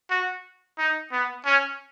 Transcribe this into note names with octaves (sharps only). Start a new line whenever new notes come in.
F#4
D#4
B3
C#4